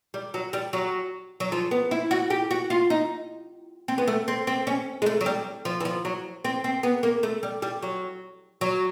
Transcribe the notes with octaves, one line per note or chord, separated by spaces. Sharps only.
G3
F#3
G3
F#3
F#3
F3
B3
E4
F#4
G4
F#4
F4
D#4
C4
B3
A3
C4
C4
C#4
G#3
A3
F#3
G3
F3
E3
F3
F#3
C4
C4
B3
A#3
A3
G3
G3
F#3
F#3